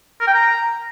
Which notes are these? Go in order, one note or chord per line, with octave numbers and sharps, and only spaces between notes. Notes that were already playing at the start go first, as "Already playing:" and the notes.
A#4
G5
A#5